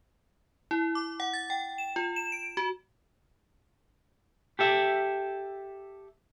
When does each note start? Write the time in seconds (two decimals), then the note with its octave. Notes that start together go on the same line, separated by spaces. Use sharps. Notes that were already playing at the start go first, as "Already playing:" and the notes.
0.71 E4
0.95 D6
1.20 F#5
1.33 A6
1.50 G5
1.78 E7
1.96 F4
2.16 E7
2.32 D7
2.57 F#4
4.59 G4 A4 E5